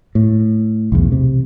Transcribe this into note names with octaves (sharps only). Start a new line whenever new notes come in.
A2
B1 E2
C3